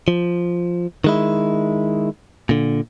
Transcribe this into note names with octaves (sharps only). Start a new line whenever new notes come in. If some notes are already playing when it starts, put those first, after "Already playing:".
F3
D#3 G#3 E4
A#2 D3